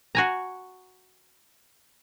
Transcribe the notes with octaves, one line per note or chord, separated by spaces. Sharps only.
F#4 G#5 A#5